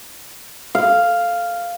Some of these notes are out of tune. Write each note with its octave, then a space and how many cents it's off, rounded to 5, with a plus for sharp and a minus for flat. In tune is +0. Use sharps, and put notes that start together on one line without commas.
F5 -5